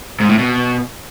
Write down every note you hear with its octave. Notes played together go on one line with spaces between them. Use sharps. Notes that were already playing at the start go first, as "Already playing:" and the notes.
G#2
A2
B2